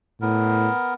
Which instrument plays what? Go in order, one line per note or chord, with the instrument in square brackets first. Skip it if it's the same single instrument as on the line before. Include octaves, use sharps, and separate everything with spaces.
[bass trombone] A2 [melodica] B3 A#4